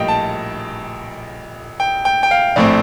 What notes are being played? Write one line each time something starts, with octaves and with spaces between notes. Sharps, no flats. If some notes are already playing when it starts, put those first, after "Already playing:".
Already playing: A#1 A2 G3 A#3 D#5 G5
A5
G5
G5
G5
F5
A#1 A2 A3 C4 D5